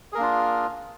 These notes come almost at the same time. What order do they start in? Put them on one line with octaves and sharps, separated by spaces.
G#4 A#4 A#3 D4 F4